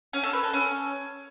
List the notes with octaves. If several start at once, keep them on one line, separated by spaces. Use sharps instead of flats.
C#4
A4
B4
A4
C#4